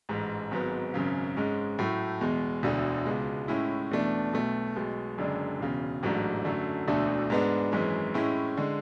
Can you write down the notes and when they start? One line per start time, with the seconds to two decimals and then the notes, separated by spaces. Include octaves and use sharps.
0.09 A1 G#2 G#3
0.51 G#1 G#2 F#3 B3
0.94 G#1 F#2 C#3
1.36 G#2 G#3 C#4
1.79 A2 F#3 A3
2.21 E2 B2 G#3
2.63 E1 D2 D3
3.06 C#2 B2 G#3
3.48 A2 G#3 C#4 E4
3.91 E2 B2 A3 D4
4.33 B1 B2 A3
4.76 B1 B2 G#3
5.18 F#1 F#2 D3 G#3 D4
5.60 E1 E2 C#3
6.03 A1 G#2 F#3 A3 D4
6.45 F#2 D3 F#3 A3
6.88 E1 D2 D3 A3 D4
7.30 G#2 G#3 B3 D4
7.72 G#1 F#2 E3 G#3 C#4
8.14 A2 G#3 C#4 E4
8.57 D3 G#3